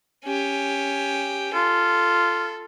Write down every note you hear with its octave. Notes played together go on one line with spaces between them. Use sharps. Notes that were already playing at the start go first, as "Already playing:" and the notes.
C#4 G4
F4 A4